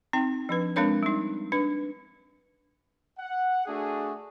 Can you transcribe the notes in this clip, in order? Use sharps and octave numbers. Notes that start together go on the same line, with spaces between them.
C4 D#4 G5
F3 D4 B4
G#3 C4 D4 A#4 C#5
G3 D#4
D4 B4
F#5
A3 D4 F#4 G#4